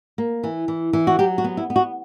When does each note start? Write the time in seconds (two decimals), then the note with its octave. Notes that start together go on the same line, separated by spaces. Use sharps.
0.18 A#3
0.43 E3
0.68 E3
0.93 E3
1.07 F#4
1.19 F#3 G4
1.38 F#4
1.44 B3
1.57 E4
1.70 B3
1.76 F#4